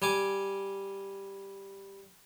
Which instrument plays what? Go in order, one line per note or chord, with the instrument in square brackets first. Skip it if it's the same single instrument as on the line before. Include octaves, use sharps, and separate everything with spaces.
[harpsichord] G3 G#5 D6